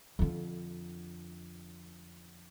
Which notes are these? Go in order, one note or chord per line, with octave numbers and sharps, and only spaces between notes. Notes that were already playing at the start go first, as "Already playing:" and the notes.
F2 D3